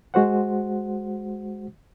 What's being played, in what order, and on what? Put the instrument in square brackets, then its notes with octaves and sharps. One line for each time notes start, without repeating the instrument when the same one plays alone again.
[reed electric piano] G#3 F#4 C5 F#5